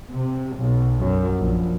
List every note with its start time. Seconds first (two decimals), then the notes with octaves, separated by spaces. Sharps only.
0.11 C3
0.57 B1
1.00 F#2
1.41 A#1